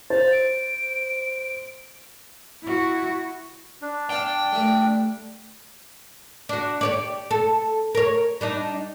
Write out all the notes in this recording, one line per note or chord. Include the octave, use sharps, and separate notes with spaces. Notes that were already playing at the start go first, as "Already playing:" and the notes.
C5 A6
D7
E4 F#4
D4
D5 F5 G5 A5
G3 A3
D4 F#4
G4 C#5 D5
A4
A#4 C#5
G3 D4 D#4